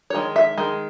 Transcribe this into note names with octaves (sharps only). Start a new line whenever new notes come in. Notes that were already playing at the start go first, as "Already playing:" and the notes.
C#5
D#3 G#3
E5
D#3 G#3